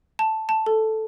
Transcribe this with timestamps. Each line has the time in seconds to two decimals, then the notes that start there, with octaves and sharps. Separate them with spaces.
0.19 A5
0.49 A5
0.66 A4